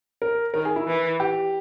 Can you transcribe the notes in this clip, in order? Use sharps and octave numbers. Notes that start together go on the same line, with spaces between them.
A#4
D#3 A#4
G#4
E4
E3
G4